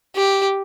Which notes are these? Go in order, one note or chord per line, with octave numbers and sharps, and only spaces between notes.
G4